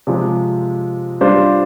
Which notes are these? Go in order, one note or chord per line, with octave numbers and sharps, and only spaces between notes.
C3 F3 G#3
G3 D4 F4 C5